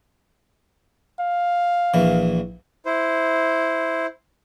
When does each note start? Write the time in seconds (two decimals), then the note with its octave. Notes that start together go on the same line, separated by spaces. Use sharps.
1.20 F5
1.94 A#1 E3
2.86 E4 C5